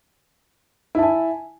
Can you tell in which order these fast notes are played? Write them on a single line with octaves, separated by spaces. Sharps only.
E4 A5 G#5